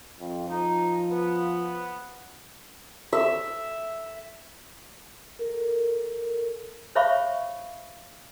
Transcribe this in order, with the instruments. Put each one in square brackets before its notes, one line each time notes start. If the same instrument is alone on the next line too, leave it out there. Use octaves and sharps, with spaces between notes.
[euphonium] F2
[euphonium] F3 [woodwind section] D#4
[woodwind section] B3
[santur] E5
[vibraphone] A4 A#4
[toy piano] C5 C#5 E5 F5 B5 C#6